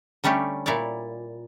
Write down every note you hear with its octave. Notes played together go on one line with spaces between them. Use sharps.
D3 G3 A3 C#4 G4
A#2 E4 C#5 D5